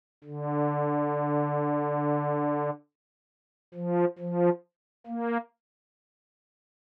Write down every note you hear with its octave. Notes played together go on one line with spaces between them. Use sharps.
D3
F3
F3
A#3